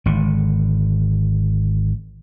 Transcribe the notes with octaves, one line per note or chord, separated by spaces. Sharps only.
G#1 D3